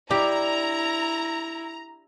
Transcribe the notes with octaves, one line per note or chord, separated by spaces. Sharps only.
D4 E4 G4 A#5